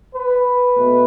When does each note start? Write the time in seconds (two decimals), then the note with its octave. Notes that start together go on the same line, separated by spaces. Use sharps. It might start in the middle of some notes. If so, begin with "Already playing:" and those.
0.13 B4
0.77 B2 A3